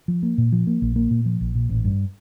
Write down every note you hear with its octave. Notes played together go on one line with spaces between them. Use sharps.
F3
A#3
A#2
F3
A#3
A#1
A#3
A#2
F3
A#1
A#2
A1
G2